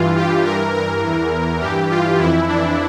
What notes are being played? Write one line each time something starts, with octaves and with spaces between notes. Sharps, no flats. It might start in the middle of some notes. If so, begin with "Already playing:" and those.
Already playing: G2 E3 F4
G4
G2 E3 A#4
A#4
E2 E3
G2 E3 G4
F4
F2 E3 E4
D4